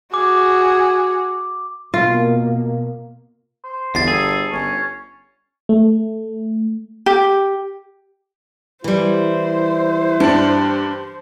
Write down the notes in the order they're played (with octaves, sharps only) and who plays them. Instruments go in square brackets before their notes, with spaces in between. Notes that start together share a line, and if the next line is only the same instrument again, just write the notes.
[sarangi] F#4 [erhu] G#4 [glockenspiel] D6
[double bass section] B2 A#3 [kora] F4
[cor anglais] C5
[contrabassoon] G1 [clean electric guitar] E2 [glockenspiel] A6 C7
[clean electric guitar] G#4 [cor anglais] A4
[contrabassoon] G1 [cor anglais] C#4
[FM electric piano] A3
[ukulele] G4
[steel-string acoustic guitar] E3 G3 [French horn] E4 [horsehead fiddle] C5
[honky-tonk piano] G2 D4 [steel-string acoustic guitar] A5